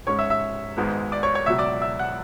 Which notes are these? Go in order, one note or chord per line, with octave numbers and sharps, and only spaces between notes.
G#2 G#3 C#4 C#5 C#6
E5 E6
E5 E6
G#1 G#2 G#3 B3
D5 D6
C#5 C#6
C#5 C#6
C#2 B2 F#3 E5 E6
D5 D6
E5 E6
F#5 F#6